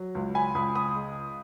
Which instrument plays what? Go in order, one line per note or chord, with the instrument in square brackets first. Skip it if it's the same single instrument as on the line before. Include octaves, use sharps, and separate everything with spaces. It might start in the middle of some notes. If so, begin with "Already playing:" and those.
Already playing: [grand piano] F#3
C#2
G#5 B5
C#2 B5 D#6
B5 D#6
G#3